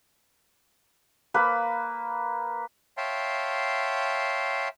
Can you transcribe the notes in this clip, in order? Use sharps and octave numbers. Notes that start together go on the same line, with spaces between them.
A#3 B4
C#5 E5 F5 G5 A5 C6